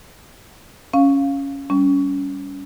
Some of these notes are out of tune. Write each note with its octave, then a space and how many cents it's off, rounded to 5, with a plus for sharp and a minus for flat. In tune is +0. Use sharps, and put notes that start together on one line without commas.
C#4 +0 F5 +0
G3 +0 C#4 +20